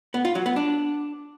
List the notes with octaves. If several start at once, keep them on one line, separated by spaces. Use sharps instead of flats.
B3
F4
F#3
B3
D4